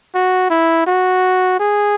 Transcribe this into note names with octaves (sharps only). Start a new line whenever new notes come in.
F#4
E4
F#4
G#4